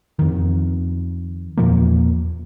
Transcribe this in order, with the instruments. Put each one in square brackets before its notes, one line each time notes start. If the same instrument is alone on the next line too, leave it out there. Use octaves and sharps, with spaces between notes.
[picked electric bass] F2 D#3
E2 A#2 F3 A#3